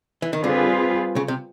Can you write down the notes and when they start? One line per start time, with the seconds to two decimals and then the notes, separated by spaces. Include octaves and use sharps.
0.22 E3
0.33 D#3
0.43 D3 G3 C4 F4 G#4 B4
1.16 C#3
1.28 C3